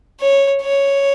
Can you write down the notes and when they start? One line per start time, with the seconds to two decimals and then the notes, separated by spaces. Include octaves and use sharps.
0.20 C#5
0.62 C#5